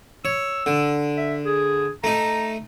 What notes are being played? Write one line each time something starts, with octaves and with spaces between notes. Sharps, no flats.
C#5 E6
D3
E5
G#4
A3 D#4 A#5